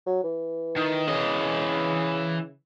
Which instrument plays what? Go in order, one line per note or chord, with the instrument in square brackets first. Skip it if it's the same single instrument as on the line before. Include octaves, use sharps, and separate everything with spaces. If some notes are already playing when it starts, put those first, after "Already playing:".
[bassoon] F#3
E3
[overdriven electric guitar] D#3
[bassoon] C#3 [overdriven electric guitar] E3 D#5